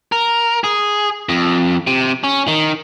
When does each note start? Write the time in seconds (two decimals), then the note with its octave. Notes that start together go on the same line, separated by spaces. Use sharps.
0.12 A#4
0.64 G#4
1.29 F2
1.87 C3
2.24 C#4
2.48 D#3